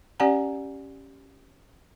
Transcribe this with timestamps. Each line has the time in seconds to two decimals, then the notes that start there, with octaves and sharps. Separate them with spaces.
0.20 C#4 G4 D5 F#5 G#5 A#5